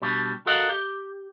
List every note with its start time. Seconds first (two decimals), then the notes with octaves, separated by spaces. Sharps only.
0.02 B2 G3 D4
0.46 F#4 A4 A#4 D#5 F5 F#5
0.69 G4